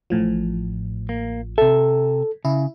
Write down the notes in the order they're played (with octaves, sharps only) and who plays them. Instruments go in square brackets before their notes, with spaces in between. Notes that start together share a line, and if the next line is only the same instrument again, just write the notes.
[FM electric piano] A1 A2 F3
[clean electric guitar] A#3
[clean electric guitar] C3 E5 [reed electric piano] A4
[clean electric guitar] C#3 [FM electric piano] E4